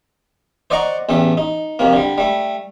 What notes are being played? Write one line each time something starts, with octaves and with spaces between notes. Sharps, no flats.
C5 D5 D#5 F#5 A#5 C#6
A1 E2 A3 G4
D#4
F2 C3 A#3
D3 G3
G3 A3